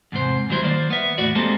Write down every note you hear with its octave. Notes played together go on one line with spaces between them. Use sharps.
E2 G#2 C3 C5
D#2 B2 F#3 G3 E4 C5
D#3 F#3 A#3 C5 D5
B3 E5
E2 A2 F#4 D5
G3 G#3 A#3 C4 G4 A4